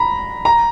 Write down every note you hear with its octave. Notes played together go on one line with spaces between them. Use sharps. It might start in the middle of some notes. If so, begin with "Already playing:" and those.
Already playing: A#5 B5
A#5